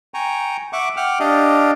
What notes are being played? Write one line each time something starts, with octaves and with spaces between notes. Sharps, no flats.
G5 G#5 A#5 C#6
E5 F#5 C#6 D6
F#5 G5 D6 F6
D4 G4 D#5 F5